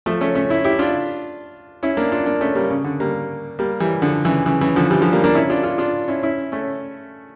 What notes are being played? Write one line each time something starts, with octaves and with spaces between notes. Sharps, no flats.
F3 A3
A3 C#4
A3 C#4
C#4 E4
E4 G4
D4 F4
C#4 E4
A#3 D4
D4 F4
A#3 D4
A3 C#4
G3 A#3
C#3
D3
G3 A#3
G3 A#3
E3 G3
D3 F3
C#3 E3
C#3 E3
C#3 E3
D3 F3
E3 G3
D3 F3
G3 A#3
A#3 D4
C#4 E4
D4 F4
D4 F4
D4 F4
C#4 E4
C#4 E4
A3 C#4